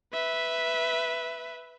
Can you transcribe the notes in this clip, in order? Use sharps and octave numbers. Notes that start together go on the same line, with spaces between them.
B4 E5